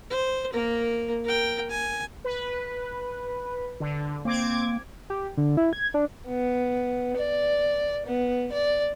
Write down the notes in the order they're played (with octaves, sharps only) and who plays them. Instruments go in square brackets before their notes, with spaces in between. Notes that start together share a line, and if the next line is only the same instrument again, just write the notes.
[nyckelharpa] C5
A#3 A#4
A#4 G5
G#5
[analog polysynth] B4
D3
[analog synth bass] A#3 [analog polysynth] C4 D6 G#6
[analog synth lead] G4
D3
E4
G#6
D4
[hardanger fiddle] B3
D5
B3
D5